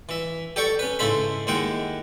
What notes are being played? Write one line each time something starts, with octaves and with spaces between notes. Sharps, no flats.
E3 E5
G4 A4 D5 G5 C#6
C#4 B4
G#2 C#3 E4 A4 C5 B5
D#2 G#3 E4 F#5 G5